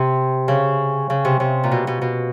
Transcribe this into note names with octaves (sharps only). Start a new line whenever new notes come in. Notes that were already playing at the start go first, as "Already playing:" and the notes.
Already playing: C3
C#3
C#3
C3
C3
A#2
B2
B2
B2